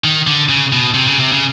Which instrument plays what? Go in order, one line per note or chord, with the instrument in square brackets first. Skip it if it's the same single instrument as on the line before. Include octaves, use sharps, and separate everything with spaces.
[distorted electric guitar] D#3
D3
C#3
B2
C3
C#3
C3
C#3